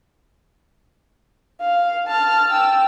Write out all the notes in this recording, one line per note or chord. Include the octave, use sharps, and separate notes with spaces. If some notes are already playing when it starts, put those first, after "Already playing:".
F5
A5 F6
G5 E6